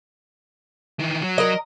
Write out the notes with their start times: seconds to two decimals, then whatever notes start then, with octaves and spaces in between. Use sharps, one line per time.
0.99 D#3 E3
1.22 F#3
1.38 A#4 D#5